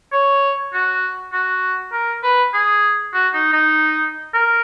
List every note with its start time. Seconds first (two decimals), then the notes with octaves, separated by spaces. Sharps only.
0.12 C#5
0.73 F#4
1.33 F#4
1.92 A#4
2.23 B4
2.54 G#4
3.14 F#4
3.33 D#4
3.53 D#4
4.34 A#4